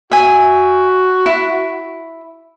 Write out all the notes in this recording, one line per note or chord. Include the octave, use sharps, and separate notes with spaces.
F#4 E5 G#5
E4